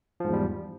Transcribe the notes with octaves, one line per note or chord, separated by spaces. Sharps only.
E2 G#2 F3 G3